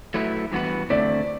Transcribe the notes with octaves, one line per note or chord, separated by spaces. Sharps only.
F#3 A3 E4 B4
G2 E3 B3 F#4 B4
D3 A3 C4 E4 D5